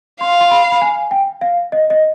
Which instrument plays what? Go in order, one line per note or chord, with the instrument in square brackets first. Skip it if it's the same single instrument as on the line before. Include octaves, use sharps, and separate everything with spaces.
[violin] F5 [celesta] C6
[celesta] C6
B5
B5
G#5
G5
F5
D#5
D#5